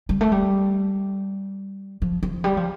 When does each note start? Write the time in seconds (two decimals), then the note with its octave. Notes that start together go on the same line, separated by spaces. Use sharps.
0.09 G3
0.21 A3
0.32 G3
2.02 F3
2.23 F3
2.44 G3
2.57 F3